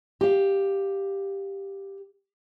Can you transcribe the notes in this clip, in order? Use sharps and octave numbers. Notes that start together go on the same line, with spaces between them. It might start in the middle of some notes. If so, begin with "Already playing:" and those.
G4 F5